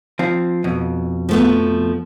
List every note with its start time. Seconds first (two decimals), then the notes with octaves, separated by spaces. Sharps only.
0.19 F3 C4
0.64 F2 B2
1.29 F3 A3 B3